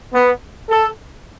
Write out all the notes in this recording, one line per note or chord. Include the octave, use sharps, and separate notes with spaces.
B3
A4